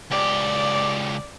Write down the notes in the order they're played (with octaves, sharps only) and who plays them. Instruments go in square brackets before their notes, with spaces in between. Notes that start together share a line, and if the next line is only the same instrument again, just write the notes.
[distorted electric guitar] C#2 G4 [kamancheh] D5